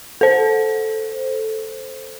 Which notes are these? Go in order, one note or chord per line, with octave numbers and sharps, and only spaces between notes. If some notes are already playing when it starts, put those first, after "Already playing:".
A4 C5